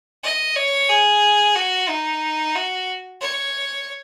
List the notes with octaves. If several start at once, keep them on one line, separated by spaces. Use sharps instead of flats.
D#5
C#5
G#4
F#4
D#4
F#4
C#5